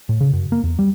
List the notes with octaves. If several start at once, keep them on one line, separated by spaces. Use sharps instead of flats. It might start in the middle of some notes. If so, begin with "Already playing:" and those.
A2
C#3
F#2
A#3
E2
G3